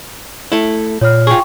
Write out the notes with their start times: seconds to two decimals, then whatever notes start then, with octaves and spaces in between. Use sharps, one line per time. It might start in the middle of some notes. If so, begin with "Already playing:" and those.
0.52 A3 E4
1.01 A#2 C#5 F6
1.27 F4 G#4 G5 C#6